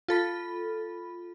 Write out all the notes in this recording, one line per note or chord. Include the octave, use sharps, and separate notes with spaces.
F4 A4 B5